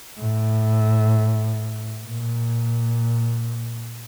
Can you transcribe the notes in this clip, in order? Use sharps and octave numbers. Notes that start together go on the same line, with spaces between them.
A2
A#2